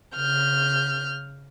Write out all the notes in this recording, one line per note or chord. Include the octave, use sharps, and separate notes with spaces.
C#3 F6 G6